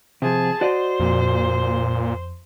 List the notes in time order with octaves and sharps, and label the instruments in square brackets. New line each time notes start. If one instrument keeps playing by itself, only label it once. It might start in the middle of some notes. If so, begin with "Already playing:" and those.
[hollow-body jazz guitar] C3 F3 [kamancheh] G#4 A5
[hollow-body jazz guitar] F#4 D5 D#5 [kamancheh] C5
[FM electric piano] F2 [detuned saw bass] A#2